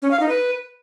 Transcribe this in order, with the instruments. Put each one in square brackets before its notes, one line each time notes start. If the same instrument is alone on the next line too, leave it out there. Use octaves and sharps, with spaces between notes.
[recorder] C#4
F5
D#4
B4